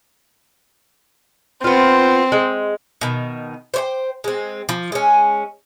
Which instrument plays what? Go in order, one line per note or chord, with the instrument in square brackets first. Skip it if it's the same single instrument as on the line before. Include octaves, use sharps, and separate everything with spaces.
[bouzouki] B3 F4 [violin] C4
[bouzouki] G#3
B2 D#3
C5 C#5 G5
G#3 C4
F3
G#3 C#4